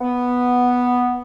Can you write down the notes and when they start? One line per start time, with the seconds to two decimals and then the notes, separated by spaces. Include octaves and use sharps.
0.01 B3